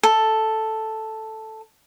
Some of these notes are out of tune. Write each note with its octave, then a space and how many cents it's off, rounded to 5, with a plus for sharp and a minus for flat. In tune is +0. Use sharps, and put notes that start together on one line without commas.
A4 +0